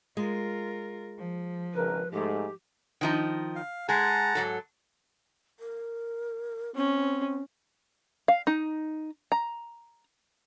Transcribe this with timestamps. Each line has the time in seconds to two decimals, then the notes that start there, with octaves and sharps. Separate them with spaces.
0.17 G#3 F4 A#4
1.18 F3
1.74 G#1 C#3 A#4 B4
2.11 G#2 A3 G4
3.01 D#3 F3 D#4
3.56 F5
3.89 G#3 G#4 F#5 A5 A#5
4.35 G#2 F#3 A4
5.60 A#4
6.76 C4 C#4
8.28 F5
8.47 D#4
9.32 A#5